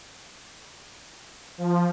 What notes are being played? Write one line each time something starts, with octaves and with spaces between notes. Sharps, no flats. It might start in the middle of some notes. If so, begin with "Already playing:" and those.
F3